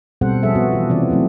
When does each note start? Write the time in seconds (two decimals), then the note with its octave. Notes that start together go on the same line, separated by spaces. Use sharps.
0.21 B2 G3 C4 A4 C5 F#5
0.43 F3 G3 C#4 G#4 A4 E5
0.55 G3 B3 F#4
0.72 E3 F4
0.89 C3 E3 C#4 D5
1.10 F3 F#3 A3 C4